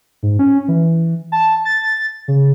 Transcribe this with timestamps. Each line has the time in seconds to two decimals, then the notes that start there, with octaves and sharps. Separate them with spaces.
0.23 G#2
0.39 C#4
0.68 E3
1.32 A5
1.65 A6
2.28 C#3